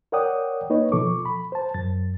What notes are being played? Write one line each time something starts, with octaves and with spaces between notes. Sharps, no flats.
A#4 C#5 D5 F#5 G5 D#6
A#3 D#4 B4 C#5 D#5
B2 F3 A4 C#6 D6
B5
C5 A5
F#2 A6